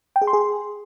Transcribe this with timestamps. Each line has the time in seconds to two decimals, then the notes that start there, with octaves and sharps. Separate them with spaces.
0.16 G5
0.22 G#4
0.27 C6
0.33 G#4